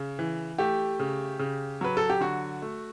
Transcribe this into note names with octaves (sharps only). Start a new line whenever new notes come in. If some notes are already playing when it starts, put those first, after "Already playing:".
Already playing: C#3
E3
A3 G4
C#3
C#3
F#3 B4
A4
G4
D3 F#4
A3